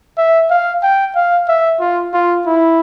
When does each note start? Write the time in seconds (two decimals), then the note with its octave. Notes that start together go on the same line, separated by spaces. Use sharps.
0.17 E5
0.50 F5
0.83 G5
1.15 F5
1.48 E5
1.80 F4
2.14 F4
2.46 E4